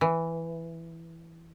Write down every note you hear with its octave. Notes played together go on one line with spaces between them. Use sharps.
E3